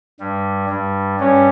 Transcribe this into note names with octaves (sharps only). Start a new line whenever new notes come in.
G2 G3
G2 G3
G2 G3 C#4